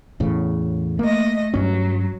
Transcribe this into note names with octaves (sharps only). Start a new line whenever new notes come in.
E2 A2 C#3
A3 A#3 D#5
G2 F#3 C#4